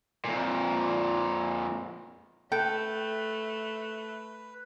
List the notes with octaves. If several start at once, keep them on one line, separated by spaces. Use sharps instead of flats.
F2 A#2
A3 A4 B4 G5